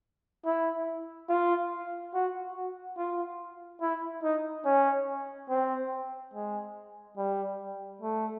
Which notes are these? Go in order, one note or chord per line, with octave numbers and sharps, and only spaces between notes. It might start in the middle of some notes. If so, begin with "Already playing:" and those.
E4
F4
F#4
F#4
F4
E4
D#4
C#4
C4
G#3
G3
A3